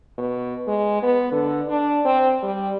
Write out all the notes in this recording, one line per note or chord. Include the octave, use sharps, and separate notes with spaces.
B2
G#3
B3
D3
D4
C4
G3